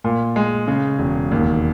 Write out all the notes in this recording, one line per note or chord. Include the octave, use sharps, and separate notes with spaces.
A#2
G#3
C#3
E1
D#2